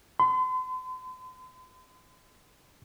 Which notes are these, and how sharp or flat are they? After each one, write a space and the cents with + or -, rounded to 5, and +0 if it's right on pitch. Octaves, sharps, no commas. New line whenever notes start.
C6 -45